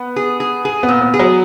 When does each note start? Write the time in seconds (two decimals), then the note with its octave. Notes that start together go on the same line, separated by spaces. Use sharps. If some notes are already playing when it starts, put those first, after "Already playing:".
Already playing: B3
0.16 G#4
0.40 G#4
0.65 G#4
0.83 B3
0.88 A#2
1.01 B3
1.14 G#4
1.19 F#3